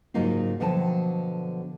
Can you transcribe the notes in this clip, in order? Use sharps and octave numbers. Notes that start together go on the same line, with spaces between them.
G#2 C#3 F#3 A#3 D#4 F4
B2 D3 F3 F#3 G5 A5